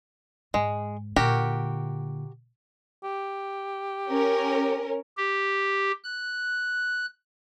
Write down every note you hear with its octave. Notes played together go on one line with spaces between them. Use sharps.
G#2 G#3
A#2 D3 F#4 G4 A#4
G4
C#4 A#4
G4
F#6